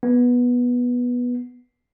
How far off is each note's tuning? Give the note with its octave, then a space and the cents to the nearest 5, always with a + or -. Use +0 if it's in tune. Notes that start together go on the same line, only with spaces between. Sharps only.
B3 -10